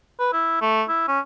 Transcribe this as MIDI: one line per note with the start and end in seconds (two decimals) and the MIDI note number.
0.20 0.28 71
0.33 0.58 64
0.61 0.83 57
0.89 1.07 64
1.08 1.20 61